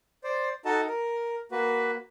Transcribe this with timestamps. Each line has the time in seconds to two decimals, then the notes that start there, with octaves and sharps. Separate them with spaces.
0.24 C5 D5
0.65 D#4 F#4 A4 D#5 A5
0.87 A#4
1.52 A#3 F#4 B4